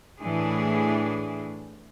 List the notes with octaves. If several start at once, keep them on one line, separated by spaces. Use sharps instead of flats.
A2 E3 D4 G#4